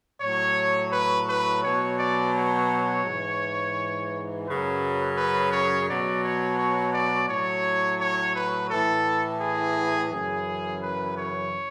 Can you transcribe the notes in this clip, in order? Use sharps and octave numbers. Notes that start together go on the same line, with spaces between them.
A2 F#3 C#5
B4
B4
B2 F#3 C#5
D5
C#5
G#2 E3
F#2 C#3 F#3 B4
B4
C#5
B2 F#3 D5
C#5
C#5
D5
A2 F#3 C#5
C#5
B4
A2 E3 A4
G#4
F#2 C#3 E3 G#4
B4
C#5